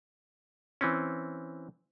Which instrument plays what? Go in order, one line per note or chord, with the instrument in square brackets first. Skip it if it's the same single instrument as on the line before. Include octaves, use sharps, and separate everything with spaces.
[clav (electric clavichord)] E3 C4 C#4